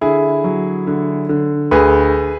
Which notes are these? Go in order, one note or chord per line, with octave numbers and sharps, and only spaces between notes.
D3 E4 G#4
F#3
D3
D3
D2 G#4 B4